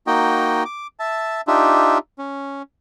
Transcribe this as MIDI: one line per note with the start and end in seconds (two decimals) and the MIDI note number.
0.07 0.64 58
0.07 0.64 63
0.07 0.64 66
0.07 0.64 75
0.07 0.64 79
0.65 0.87 86
1.00 1.41 76
1.00 1.41 81
1.47 1.98 62
1.47 1.98 63
1.47 1.98 65
1.47 1.98 67
1.47 1.98 76
2.19 2.62 61